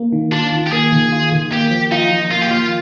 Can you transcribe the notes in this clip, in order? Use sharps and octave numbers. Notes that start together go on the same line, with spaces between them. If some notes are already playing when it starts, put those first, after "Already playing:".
Already playing: A#3
D#3
D4 F4
D#3
G4
A#3 G#4
D#3
F4
D#3
A#3 G4
F3
D#4 F4
F3
A#3 F4
G4
F3 F4